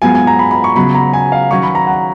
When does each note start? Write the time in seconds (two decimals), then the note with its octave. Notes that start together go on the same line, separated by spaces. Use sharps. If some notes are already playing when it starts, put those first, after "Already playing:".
0.02 G#2 F#3 B3 F4 G#5
0.15 G#5
0.27 A#5
0.39 B5
0.51 B5
0.64 C#6
0.76 C#3 F#3 B3 B5
0.95 A#5
1.13 G#5
1.32 F5
1.51 D#3 F#3 C#4 C#6
1.63 B5
1.75 A#5
1.87 F#5